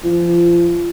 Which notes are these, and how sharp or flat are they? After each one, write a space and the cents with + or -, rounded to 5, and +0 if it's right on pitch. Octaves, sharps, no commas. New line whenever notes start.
F3 -25